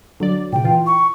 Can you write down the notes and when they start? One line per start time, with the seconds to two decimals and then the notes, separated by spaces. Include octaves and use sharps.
0.20 D3 F#3 D5
0.53 A#2 C#3 G5
0.64 E3 F4
0.86 C#6